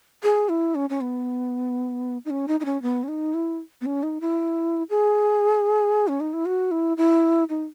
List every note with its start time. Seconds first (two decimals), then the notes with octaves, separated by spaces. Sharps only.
0.23 G#4
0.49 E4
0.75 C#4
0.90 C#4
1.01 B3
2.25 D#4
2.30 C#4
2.48 D#4
2.60 D#4
2.65 C#4
2.82 B3
3.03 C#4
3.08 D#4
3.34 E4
3.81 B3
3.86 C#4
4.03 D#4
4.21 E4
4.90 G#4
6.08 C#4
6.20 D#4
6.33 E4
6.46 F#4
6.71 E4
6.97 E4
7.49 D#4